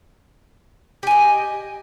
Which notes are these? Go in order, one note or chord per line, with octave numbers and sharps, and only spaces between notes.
G4 D#5 G#5